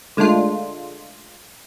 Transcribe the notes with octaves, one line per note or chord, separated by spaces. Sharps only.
D3 G#3 A3 D4 F4